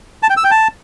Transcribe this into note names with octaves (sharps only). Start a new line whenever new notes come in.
A5
G5
E6
G5
A5